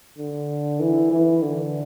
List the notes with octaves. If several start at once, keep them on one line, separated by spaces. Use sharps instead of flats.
D3
E3
E3
D3